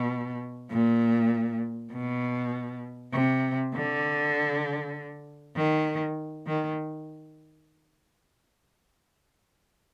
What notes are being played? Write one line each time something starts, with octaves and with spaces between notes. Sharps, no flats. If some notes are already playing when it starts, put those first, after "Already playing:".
Already playing: B2
A#2
B2
C3
D3
D#3
D#3